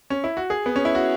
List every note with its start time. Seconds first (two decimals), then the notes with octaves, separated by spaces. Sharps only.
0.10 C#4
0.24 E4
0.37 F#4
0.50 G#4
0.66 B3
0.76 C#4
0.85 E4
0.95 F#4